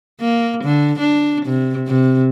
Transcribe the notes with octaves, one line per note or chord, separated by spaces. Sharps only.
A#3
D3
D4
C3
C3